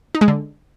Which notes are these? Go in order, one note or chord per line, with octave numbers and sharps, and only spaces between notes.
D#4
G#3
D3